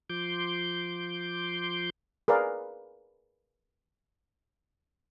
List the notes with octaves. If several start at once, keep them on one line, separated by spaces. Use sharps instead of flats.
F3 C6 D6 G6
G#4 A#4 B4 D5 F5